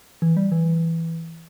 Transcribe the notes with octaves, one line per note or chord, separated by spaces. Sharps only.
E3
G3
E3